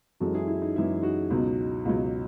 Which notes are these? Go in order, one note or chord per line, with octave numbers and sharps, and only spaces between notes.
F#2 E3 G#3 F#4 A4
E4 G#4
E4
D#4
F#2 E3 G#3 E4
D#4 F#4
C#2 B2 F#3
C#2 B2 F#3